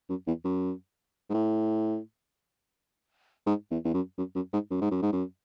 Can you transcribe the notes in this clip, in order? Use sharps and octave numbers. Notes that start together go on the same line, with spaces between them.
F#2
E2
F#2
G#2
A2
G#2
E2
E2
F#2
F#2
F#2
G#2
F#2
G#2
F#2
G#2
F#2